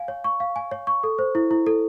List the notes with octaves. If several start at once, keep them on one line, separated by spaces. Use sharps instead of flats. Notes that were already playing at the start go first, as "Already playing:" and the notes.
Already playing: F5 G#5
C#5
C#6
F5
G#5
C#5
C#6
A4
C5
E4
E4
A4